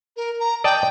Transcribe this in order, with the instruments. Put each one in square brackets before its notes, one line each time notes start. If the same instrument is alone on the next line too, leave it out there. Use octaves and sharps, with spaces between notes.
[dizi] A#4
A#5
[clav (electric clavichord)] D5 D#5 A5 [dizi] G5